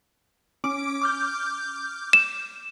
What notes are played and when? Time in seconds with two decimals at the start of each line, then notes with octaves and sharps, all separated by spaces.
0.64 C#4 D6 D7
1.02 D6 F6 G6
2.13 E7